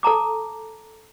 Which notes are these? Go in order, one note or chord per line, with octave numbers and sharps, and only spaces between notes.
A4 A5 A#5 D6